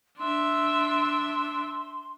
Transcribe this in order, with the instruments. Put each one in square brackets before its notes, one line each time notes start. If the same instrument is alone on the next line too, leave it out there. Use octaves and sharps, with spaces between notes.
[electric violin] D4 E5 [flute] C6